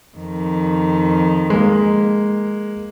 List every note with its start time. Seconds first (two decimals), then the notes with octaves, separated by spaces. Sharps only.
0.17 F2 D#3
1.50 G#3 A#3